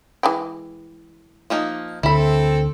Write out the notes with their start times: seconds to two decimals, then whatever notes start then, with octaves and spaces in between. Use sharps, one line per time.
0.23 E3 G#3 G5
1.50 F3 A#3 D#4
2.03 D2 D3 C4 E4 A4 B5